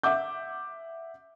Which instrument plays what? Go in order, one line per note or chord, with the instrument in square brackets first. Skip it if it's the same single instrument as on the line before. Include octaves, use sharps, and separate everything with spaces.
[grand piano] E5 F#5 D6 G6